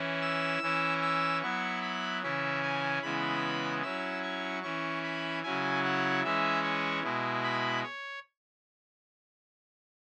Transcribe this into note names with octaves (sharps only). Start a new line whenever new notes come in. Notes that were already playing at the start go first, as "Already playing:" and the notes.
Already playing: E3 C#4 E4
E6
E3 C#4 E4
E6
F#3 B3 E4 C#6
B5
C#3 E3 C#4 E4 E5
G#5
C#3 E3 G#3 B3 E4 B5
F#3 C#4 E4 E6
C#6
E3 C#4 E4 C#6
B5
C#3 F#3 C#4 E4 G#5
F#5
E3 G#3 C#4 E4 E5
C#5
B2 G#3 E4
B5
C#5